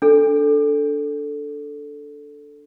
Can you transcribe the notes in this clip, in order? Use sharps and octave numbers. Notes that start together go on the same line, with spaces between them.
D4 A4